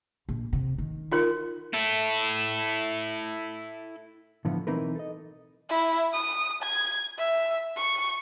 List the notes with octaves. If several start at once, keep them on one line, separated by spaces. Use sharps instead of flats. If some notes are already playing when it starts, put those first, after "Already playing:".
A#1
C3
D#3
D#4 F4 A#4
E4 A4
A2 D3 E3 F3 B3
B1 E3 C4 D#4 A#4 B4
A4 D#5
E4
D#6
G#6
E5
C#6